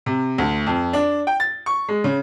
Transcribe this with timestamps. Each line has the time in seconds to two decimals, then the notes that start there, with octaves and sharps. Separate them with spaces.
0.06 C3
0.38 D2
0.67 F2
0.93 D4
1.27 G5
1.40 A6
1.66 C#6
1.88 G#3
2.04 C#3